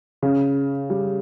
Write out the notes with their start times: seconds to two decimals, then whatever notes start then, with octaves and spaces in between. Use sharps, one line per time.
0.23 C#3
0.90 G3